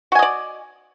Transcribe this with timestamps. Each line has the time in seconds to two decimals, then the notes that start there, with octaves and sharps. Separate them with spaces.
0.12 F#4
0.15 G#5
0.19 D#5
0.22 D5